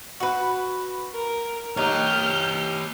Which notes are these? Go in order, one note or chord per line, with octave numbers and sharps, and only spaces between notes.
F#4 B4
A#4
D#4 G4 C#5 F6 G6